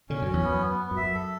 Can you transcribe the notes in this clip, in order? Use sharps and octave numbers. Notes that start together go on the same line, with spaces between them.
B2 D3 C#4
F#2
C#4
E2
F#2 B3
B3
B3
F#2
E5
F#2
A4